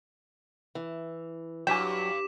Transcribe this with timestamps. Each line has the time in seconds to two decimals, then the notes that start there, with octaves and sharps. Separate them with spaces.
0.75 E3
1.67 G2 F#3 G5 G#5 D6 B6 E7